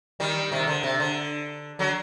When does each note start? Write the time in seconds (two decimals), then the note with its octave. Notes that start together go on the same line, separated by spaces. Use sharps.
0.20 D#3 G3
0.52 C3 D#3
0.67 D3
0.83 C3
1.00 D3
1.79 D3 F#3